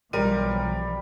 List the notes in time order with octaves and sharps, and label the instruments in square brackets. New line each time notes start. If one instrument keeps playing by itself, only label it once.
[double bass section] B1 E3 F3 [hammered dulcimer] G3 [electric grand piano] A#4 D#7